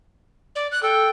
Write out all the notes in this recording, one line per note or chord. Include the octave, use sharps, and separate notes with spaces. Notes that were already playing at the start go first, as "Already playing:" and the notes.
D5
F#6
A4 G5